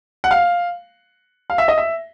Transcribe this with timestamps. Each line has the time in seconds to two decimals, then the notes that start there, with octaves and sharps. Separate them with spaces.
0.24 F#5
0.31 F5
1.50 F5
1.58 E5
1.68 D#5
1.78 E5